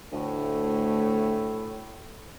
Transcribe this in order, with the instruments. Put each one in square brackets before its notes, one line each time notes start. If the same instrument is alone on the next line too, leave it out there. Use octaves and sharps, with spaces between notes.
[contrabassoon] D2 [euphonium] A2